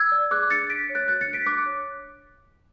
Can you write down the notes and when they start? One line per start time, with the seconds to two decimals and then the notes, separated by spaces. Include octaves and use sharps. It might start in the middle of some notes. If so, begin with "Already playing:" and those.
Already playing: E6 G#6
0.12 D5
0.31 G#4 D6 F#6
0.50 D4 A6 C#7
0.70 D4 B6 D7
0.89 C#5
0.95 F#6 A6
1.08 F#4 F#6 A6
1.21 A6 C#7
1.28 D4
1.33 B6 D7
1.46 D4 D6 F#6
1.66 C#5